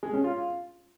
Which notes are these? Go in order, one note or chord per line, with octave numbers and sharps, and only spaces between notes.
G#3
C#4
F4